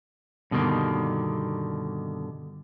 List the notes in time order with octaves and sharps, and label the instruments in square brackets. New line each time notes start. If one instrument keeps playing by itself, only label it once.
[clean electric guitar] G2 B2 D3 D#3 A#3